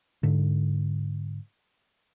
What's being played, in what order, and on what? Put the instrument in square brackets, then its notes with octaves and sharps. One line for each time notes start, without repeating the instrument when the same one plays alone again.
[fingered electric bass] G#2 D3